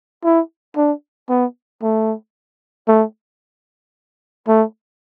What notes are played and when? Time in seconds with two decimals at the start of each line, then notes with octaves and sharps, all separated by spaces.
0.24 E4
0.76 D4
1.30 B3
1.82 A3
2.88 A3
4.48 A3